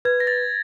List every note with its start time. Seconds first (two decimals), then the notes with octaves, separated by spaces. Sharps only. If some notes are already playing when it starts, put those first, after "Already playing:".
0.05 B4 G#6
0.20 A#6
0.27 A6